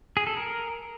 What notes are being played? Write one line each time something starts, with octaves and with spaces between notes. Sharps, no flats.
G#4
A4
A#4